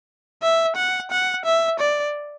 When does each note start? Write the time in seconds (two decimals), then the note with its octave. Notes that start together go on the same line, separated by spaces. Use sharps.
0.42 E5
0.76 F#5
1.11 F#5
1.45 E5
1.80 D5